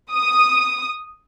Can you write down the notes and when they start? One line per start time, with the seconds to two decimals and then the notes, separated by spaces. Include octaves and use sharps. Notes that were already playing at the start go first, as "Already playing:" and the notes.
0.12 D#6